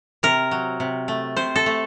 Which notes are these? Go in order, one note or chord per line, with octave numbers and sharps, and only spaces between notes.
C3 A#4
F#3
C3
A3
C3 C5
A4
A3